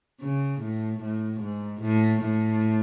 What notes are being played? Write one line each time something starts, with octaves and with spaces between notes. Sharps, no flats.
C#3
A2
A2
G#2
A2
A2